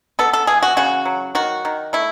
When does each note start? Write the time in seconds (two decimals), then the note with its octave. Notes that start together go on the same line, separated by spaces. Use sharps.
0.19 B3 A4
0.33 A4
0.47 E3 G#4
0.63 F#4
0.77 C#3 F#4
1.05 F#3
1.35 D#3 F#4
1.65 D#3
1.93 A3 E4